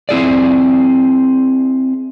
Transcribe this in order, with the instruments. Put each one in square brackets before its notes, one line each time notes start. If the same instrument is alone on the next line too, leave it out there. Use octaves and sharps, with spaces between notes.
[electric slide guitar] C4 E4 G#4 D5